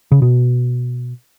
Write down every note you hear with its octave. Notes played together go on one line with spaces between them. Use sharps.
C#3
B2